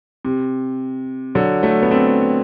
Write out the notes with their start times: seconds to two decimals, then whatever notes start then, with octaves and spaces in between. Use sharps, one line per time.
0.25 C3
1.35 D3 F#3
1.63 F#3 A3
1.83 B3
1.91 A3 C4